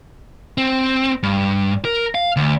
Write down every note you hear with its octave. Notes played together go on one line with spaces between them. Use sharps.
C4
G2
A#4
F5
D2